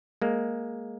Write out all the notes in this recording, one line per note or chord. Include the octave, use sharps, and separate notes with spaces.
G#3 A#3